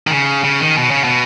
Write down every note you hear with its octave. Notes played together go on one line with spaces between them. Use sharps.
D#3
C#3
C#3
D#3
B2
C#3
B2